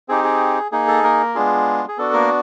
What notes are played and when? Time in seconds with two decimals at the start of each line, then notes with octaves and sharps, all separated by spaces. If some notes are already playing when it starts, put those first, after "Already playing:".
0.08 C4 D#4 G4 G#4
0.24 G#4
0.72 A#3 D#4 G#4
0.88 A4
1.03 A#3 A#4
1.35 G#3 B3 D4 F4 G#4
1.88 G#4
1.98 B3 D4 F#4 A4
2.13 A#3 A#4